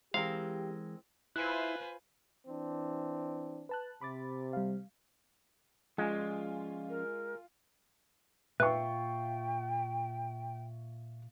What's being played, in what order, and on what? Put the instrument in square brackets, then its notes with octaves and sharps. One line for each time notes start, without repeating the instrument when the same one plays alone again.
[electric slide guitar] E3 G#3 [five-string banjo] C4 A#4 [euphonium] G4 [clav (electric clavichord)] F5
[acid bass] E4 [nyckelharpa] F4 C5 [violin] B4 G#5 [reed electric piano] F#6
[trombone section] E3 C4 D4
[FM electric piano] B4 A5 F#6
[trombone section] C3 [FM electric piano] B5 D6 A6
[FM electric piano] G3 F5
[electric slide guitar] F3 C#4 D5 [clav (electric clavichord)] G#3 [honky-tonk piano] F4 G#5
[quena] A#4
[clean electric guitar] A#2 F4 [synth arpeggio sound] B4 [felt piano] E5 C#6 [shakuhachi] G5